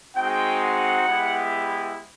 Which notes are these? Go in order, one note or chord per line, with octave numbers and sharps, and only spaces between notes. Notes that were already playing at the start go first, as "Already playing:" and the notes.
G#3 C4 D#4 F#4 G5
F#5
G#3 B3 E4 G4